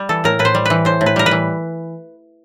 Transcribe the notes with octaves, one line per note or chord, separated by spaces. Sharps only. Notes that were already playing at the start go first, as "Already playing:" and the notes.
Already playing: G3
E3 A4
A2 A#4
A2 B4
C5
G3
E3 B4
A2 C5
A2
B4
G3 A#4
B4
E3